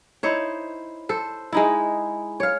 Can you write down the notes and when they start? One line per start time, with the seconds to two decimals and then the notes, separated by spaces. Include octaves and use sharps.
0.23 D#4 E4 C5 C#5
1.09 A4 C5
1.53 G#3 D#4 E4
2.40 C#5 F5